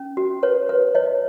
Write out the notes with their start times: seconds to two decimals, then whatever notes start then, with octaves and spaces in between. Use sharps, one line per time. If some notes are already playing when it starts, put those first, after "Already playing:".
Already playing: C#4
0.17 F#4
0.43 B4 C#5
0.69 B4
0.95 C#5 D#5